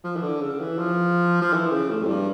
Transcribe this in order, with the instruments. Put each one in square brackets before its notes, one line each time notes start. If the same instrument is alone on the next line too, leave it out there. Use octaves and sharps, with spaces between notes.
[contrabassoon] F3
E3
D3
C#3
E3
F3
F3
E3
C#3
A2
F2
G2